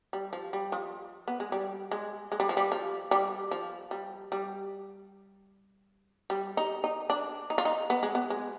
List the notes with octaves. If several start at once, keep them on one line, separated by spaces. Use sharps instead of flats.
G3
F3
G3
F3
B3
G#3
G3
G#3
G#3
G3
F3
G3
F3
G3
F3
G3
G3
G3
D#4
D#4
D4
D#4
F4
D#4
B3
G#3
B3
G#3